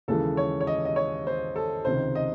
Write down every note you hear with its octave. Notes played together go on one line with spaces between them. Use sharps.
D#2 C#3 E3 G#3 A4
C#5
C#5
D#5
D#5
C#5
C5
A4
C#2 C3 D#3 C5
D#5